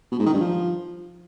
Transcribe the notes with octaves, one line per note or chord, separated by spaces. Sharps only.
B2
G#2
D#3
G2
F3